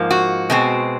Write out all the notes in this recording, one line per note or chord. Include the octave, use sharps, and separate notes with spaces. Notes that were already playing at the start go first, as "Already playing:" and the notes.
Already playing: G#2 F3 A#3
F#4
B2 G#3 C4